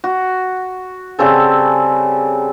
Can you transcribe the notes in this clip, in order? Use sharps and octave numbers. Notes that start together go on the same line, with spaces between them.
F#4
C#3 G3 C4 A4